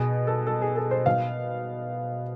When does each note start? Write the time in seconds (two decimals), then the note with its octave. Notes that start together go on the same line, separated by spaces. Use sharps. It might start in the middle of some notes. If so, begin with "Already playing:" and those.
Already playing: B2 G#4
0.27 A4
0.47 A4
0.62 G#4
0.76 A4
0.91 C5
1.06 B2 F5